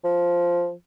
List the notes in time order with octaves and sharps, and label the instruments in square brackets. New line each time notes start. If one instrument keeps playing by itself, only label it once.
[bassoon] F3